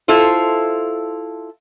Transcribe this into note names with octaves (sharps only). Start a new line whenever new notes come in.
E4 F4 A4 C5